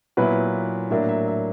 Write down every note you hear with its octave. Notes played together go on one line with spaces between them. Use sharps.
A#2 F#3 B3 E4 B4
A2 F#3 A#3 D4 E5
E5
E5